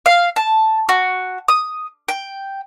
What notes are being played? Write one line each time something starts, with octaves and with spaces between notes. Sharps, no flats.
F5
A5
F#4
D#6
G5